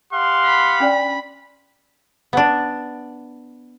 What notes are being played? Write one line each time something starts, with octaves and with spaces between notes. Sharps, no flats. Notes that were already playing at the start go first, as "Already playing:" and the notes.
G4 F5 F#5 C6
B5
C#4 D4 D5
B3 D4